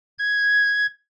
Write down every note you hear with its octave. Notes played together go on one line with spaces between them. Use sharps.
G#6